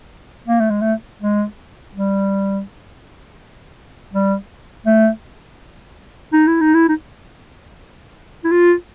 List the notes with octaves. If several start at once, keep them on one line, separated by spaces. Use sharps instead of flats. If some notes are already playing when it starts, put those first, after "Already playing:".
A#3
A3
G#3
A3
G#3
G3
G3
A3
D#4
E4
D#4
E4
D#4
E4
F4